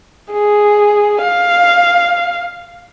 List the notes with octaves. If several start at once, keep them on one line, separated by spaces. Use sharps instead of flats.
G#4
F5